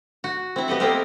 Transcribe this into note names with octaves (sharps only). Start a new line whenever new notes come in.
F#4
C4 E4
B3 G4 D#5 F#5
A3 A#3 C4 G4 A#4 C5